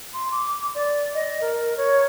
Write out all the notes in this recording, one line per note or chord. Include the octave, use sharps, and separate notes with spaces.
C6
D6
D5
D#5
A#4
C#5